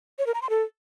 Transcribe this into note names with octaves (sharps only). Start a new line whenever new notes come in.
C#5
A#4
A#5
C6
A4